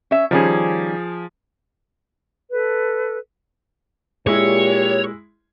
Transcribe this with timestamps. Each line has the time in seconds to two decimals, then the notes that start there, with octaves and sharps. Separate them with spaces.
0.11 C#4 E5
0.31 D#3 F3 G3 C#4 G#4
2.51 A4 B4
4.27 A#2 G#3 E4 G4 C#5